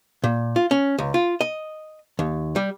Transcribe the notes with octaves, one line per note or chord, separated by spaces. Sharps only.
A#2
F4
C#4
C#2
F4
D#5
D#2
G3